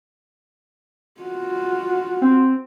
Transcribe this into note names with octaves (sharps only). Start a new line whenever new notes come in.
F4 F#4
C4